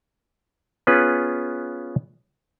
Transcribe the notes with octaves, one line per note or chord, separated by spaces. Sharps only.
B3 C#4 F4 G#4 B4